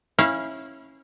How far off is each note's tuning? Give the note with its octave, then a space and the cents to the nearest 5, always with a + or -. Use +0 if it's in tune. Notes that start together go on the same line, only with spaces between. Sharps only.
C#4 -20 E4 -20 F5 -10